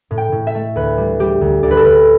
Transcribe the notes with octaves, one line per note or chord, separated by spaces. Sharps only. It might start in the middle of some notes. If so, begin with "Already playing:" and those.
A2
G5
A2
E5
A3
D2 B4
G3
G3 G4
D2
D2 D5
B4
A4
D2 B4